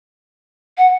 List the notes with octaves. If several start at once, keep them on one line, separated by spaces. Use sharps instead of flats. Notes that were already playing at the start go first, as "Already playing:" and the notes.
F#5